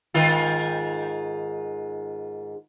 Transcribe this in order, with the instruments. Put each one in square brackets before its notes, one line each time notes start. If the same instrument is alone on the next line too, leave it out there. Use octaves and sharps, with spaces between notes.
[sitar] G#2 D#3 F4